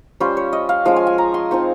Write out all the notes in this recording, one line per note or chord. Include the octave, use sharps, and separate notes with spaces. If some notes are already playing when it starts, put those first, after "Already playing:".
G3 C#4 F4 C5
C#5
D#5
F5
F3 G#3 C#4 F4 F5
G#5
G#5
A#5
C6
F3 C4 D#4 C#6